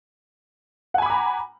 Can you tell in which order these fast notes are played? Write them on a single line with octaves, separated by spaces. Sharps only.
F#5 G#5 B5 D6 A#5